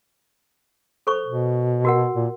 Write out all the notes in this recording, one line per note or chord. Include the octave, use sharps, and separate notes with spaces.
A4 C5 C#6
B2
F#4 A#4 F#5
A#2